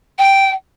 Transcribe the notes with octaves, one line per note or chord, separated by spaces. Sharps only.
G5